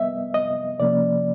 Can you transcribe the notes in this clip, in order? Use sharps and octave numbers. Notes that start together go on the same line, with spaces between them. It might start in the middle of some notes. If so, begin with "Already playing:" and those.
Already playing: G3 B3 D#5 E5
D#5
C3 F3 A#3 C#4 D5